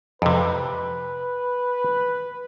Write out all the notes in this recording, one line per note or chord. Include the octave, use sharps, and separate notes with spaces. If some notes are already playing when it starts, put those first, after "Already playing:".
F2 C3 B4